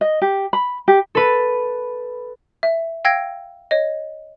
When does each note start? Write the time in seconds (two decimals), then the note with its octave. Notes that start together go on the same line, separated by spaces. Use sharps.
0.01 D#5
0.22 G4
0.53 B5
0.88 G4
1.15 A4 B4
2.63 E5
3.05 F5 G5 E6 G#6 A#6 D7
3.71 C#5 D#5